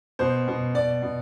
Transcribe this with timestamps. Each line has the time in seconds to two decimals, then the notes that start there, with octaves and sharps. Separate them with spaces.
0.19 B2 C5
0.48 B2
0.75 B2 D5
1.03 B2